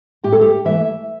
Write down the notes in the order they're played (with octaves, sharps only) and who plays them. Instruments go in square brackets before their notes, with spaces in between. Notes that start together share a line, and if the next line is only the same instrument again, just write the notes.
[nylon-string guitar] A2 G4
A4
G4
E3 A3 E5